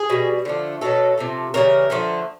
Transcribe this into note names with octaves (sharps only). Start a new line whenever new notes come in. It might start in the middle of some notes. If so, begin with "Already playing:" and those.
Already playing: G#4
B2 G3
D3 F3 A3
B2 F#3 A3 A4
C3 F3 A3
C#3 E3 G3 A#4
D3 F3 A3